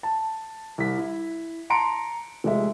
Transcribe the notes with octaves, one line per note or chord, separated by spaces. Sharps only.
A5
C2 B6
E4
A5 A#5 C6 C#7 D7
F1 G#3 E5